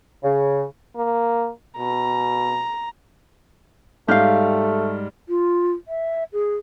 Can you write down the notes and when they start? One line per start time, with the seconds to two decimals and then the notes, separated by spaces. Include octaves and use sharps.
0.24 C#3
0.96 A#3
1.78 B2 A#5
4.08 G#2 G3 A3 G4 F5 F6
5.29 F4
5.88 E5
6.33 G#4